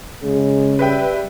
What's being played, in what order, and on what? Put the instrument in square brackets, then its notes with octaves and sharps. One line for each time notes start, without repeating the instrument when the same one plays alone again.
[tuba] C#3 [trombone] G#3
[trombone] G3 [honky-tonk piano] B4 E5 G5